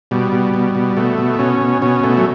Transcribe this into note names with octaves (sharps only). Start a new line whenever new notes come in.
B2 G3
B2
B2
B2
B2 A3
B2
B2 C#4
B2
B2 C#4
B2 A3
F#3